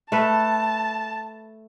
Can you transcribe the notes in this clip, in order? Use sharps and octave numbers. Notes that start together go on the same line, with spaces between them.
A3 B4 A5